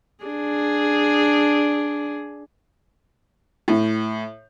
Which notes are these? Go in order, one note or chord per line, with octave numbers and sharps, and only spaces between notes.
D4 G#4
A2